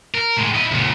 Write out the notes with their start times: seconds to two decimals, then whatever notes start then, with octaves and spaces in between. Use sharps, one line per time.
0.14 A#4
0.36 A2 G#3
0.55 E4 D#5
0.71 C#2 A#2